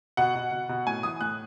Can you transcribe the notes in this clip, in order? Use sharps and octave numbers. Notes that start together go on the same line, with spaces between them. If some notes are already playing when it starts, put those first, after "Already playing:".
B2 F#5
B2
B2
B2
A2 G#5
E3 D#6
A2 F#6